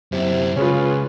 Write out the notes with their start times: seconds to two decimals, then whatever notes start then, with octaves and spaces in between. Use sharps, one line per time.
0.12 F#2 C3 E4
0.56 C#2 C#4 F4 G#4 B4